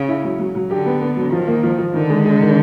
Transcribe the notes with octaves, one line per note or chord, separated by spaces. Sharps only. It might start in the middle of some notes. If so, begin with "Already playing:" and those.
Already playing: C#3
E4
F#3
F#3
F#3
D3 G4
B3
B3
F#3
D#3 F3
A#3
F3
F3
D3 D#3
G#3
G#3
D#3